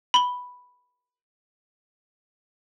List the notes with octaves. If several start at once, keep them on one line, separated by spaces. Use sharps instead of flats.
B5 G7